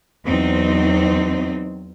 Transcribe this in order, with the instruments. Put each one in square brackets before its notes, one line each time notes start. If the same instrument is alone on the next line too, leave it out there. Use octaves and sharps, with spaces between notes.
[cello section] E2 F#3 C4 D#4